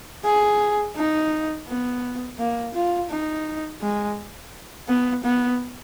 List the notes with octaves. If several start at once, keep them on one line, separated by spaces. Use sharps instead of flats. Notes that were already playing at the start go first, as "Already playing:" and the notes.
G#4
D#4
B3
A#3
F4
D#4
G#3
B3
B3